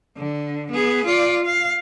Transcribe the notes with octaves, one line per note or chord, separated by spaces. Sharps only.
D3
B3 G#4
F4 D5
F5